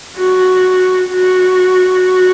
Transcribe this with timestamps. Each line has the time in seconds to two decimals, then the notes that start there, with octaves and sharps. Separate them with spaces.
0.17 F#4
1.10 F#4